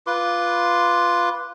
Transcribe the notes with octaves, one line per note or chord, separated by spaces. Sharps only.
F4 B4 C6 D6